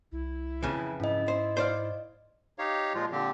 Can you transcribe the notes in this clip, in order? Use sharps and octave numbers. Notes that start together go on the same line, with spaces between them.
C2 E4
F2 C#3 E3
G#2 C#4 E4 D#5
C5 D#5
C5 D5 F5
D#4 G4 C#5 F5
A#2 F3 G#3 F4
A#2 D3 F3 C4 G4